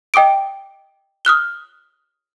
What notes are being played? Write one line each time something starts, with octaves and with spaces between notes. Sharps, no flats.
D#5 G5 D6 D#6 D7
D#6 F6 F#6 G7